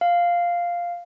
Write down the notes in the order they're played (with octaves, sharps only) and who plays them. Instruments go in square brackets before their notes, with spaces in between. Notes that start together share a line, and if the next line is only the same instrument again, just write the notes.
[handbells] F5